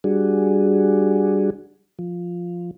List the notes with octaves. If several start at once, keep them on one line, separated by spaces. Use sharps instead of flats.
G3 D4 F#4 G#4
F3